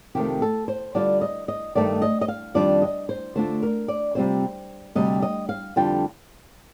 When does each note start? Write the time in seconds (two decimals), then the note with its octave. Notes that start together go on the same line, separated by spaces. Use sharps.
0.15 F2 C3 D#3 A3 G4
0.42 A4
0.68 C5
0.95 D3 G3 D4 F4 D5
1.21 D#5
1.48 D#5
1.75 G2 D#3 A3 D#4 D5
2.02 D#5
2.21 D#5
2.28 F5
2.54 F2 D#3 G3 D4 F4 D5
2.82 D#5
3.09 C5
3.35 D3 A3 D4 F4 C5
3.63 A#4
3.88 D5
4.15 C3 G3 C4 F4 C5
4.95 D2 C3 G3 D#5
5.22 D#5
5.49 F5
5.76 F2 D3 G3 D4 F4 G5